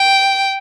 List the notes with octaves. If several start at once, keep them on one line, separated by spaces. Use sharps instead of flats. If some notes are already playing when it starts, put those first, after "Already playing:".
Already playing: G5